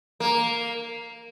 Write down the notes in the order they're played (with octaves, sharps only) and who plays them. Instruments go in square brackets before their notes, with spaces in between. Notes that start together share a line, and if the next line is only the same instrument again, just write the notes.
[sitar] A#3